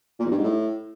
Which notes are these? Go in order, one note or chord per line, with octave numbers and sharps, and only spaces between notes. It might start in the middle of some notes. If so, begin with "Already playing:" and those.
A#2
E2
G2
G#2
A2